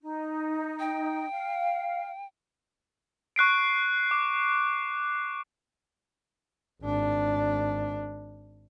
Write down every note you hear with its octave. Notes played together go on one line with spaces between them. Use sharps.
D#4
G5
F5
C#6 F#6 C7 D7
D6
G#1 D4